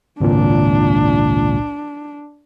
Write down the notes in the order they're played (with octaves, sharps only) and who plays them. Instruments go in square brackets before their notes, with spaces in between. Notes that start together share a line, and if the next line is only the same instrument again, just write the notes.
[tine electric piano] G#1 C#2 A#2 [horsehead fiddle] D4